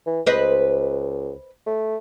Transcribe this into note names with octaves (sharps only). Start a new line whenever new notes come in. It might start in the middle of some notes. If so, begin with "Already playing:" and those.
E3
C#2 B4 C5 D#5
A3